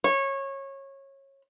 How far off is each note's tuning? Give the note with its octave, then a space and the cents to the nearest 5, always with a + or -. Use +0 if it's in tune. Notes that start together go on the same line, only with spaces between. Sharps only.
C#5 -20